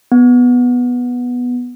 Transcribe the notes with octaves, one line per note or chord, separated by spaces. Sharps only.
B3